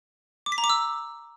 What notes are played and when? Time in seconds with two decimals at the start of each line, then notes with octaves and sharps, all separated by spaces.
0.46 D6
0.52 B6
0.58 A#5
0.64 D6
0.70 E6